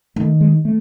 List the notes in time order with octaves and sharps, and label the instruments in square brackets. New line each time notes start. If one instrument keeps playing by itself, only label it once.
[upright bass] D#3 [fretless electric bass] A3
[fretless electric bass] G#3
A3